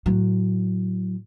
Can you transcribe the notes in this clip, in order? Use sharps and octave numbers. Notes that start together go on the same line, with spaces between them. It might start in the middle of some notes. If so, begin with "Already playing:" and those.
A2 F#3